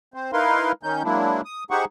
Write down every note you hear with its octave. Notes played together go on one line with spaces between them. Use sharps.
C4 C5
D#4 E4 A#4 B4 F5 C6
D#3 C#4 D#4 G6
F#3 G#3 A#3 D4 E4
D#6
D#4 G4 G#4 C5 F#5 C#6